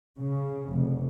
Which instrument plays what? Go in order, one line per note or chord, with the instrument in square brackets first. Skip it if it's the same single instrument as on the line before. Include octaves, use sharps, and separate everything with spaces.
[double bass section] C#3
F1